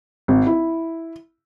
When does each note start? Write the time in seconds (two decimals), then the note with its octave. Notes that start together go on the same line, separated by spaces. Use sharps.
0.28 G#1
0.46 E4